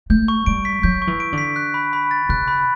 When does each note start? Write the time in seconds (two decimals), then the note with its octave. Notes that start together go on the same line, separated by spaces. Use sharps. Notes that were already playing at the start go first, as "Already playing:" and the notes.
0.10 A3 G6
0.28 C#6
0.46 G3 D7
0.65 B6
0.83 F#3 G6
1.02 C#6
1.07 E3
1.20 D7
1.33 D3
1.38 B6
1.56 F#6
1.74 B5
1.93 B5
2.11 A6
2.29 C#3 F#6
2.48 B5